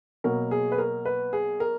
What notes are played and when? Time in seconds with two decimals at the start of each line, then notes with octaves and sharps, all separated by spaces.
0.24 B2 F#3 A#3 A#4
0.51 G#4
0.72 B4
0.78 A#4
1.05 B4
1.33 G#4
1.60 A#4